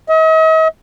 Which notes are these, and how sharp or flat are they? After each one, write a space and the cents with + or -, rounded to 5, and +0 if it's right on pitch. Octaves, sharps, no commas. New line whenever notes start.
D#5 +45